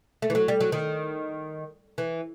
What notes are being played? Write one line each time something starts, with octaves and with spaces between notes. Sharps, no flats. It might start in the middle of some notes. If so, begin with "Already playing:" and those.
A3
E3
F#3
G3
F#3
D#3
E3